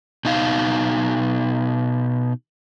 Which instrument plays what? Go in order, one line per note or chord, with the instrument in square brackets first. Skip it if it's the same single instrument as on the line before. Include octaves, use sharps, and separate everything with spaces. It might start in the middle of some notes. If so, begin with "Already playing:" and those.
[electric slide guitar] B2 D#4 F5